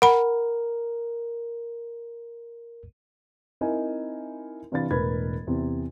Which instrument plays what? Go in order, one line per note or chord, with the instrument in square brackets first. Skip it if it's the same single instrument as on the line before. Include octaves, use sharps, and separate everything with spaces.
[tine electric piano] A#4 [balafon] F#5 B5
[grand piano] C4 D#4 E4 A#4 G#5
C3 E3 D4 F5 B5 A6
E1 A2 A#4 B4 B5 G#6
E2 C3 E4